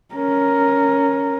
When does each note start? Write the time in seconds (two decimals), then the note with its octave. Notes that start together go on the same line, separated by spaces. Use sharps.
0.15 C#4 A#4